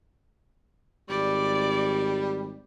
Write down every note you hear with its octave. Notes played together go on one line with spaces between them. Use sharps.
G#1 G3 D5